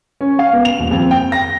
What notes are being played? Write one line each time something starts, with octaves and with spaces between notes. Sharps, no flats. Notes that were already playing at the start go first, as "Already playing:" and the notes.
C#4
F5
B3
F7
D#1
F2
G5
A#6